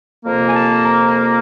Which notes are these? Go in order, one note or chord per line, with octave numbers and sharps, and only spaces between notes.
F2 C3 F3 A#3
G#5
A5
A#5
A#5